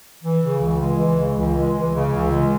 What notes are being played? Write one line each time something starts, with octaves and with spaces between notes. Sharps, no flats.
E3
C#3
C#2
G#3
E3
C#3
C#2
G#3
E3
C#3
C#2
G#3